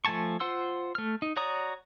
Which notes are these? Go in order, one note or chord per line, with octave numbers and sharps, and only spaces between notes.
F3 A3 G#5 A5 C#6
F4 C5 F#5 C6 E6
A3 F6
D#4
F#4 C#5 D5 A#5 D#6